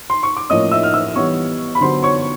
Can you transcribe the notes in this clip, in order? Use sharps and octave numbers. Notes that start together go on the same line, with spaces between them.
C6
C#6
D6
A2 F3 A#3 C#4 D#5 D#6
E5 E6
F6
E5 E6
E3 G3 B3 C#5 C#6
B5
D3 F#3 B3 C5 C6
C#5 C#6